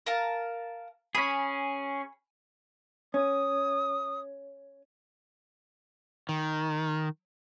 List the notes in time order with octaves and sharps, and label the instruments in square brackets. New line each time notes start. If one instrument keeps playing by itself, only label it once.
[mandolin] A#4 F5 A5
[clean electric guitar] C#4 G#4 [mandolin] G#5 B5
[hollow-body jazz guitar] C#4 [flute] D#6
[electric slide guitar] D#3